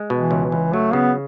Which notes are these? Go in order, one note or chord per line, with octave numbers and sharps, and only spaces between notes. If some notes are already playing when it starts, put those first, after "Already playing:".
Already playing: G#3
B2
E3
C#2
E3
C#2
F#3 A3
C#3 B3